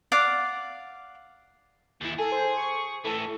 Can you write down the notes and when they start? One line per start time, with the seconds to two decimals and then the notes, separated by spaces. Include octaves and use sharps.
0.12 D5 F5 F#5 D6
2.01 D#2 E3
2.19 G#4 A4
2.32 C5
2.57 C#6
3.05 A2 E3 A4